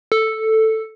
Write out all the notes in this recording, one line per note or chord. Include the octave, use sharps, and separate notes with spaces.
A4